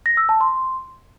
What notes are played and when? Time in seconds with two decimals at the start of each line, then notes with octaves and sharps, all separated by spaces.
0.06 A#6
0.17 E6
0.29 A5
0.41 C6